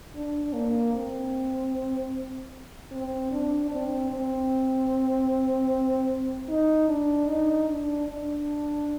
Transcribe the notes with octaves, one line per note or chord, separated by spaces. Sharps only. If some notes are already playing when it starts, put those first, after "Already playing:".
D4
A#3
C4
C4
D4
C4
C4
D#4
D4
D#4
D4
D4